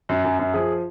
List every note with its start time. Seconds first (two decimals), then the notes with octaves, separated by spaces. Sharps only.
0.09 F#2
0.24 F#2
0.39 F#2
0.53 F3 G#4